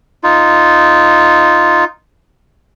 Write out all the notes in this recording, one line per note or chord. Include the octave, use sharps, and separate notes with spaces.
D#4 F4